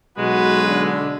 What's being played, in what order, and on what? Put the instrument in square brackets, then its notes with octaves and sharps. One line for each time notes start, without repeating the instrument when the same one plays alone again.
[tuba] B1 [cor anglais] G#3 [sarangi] F#4 [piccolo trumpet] B4
[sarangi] D3